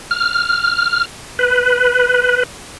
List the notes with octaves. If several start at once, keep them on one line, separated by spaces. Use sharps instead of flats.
F6
B4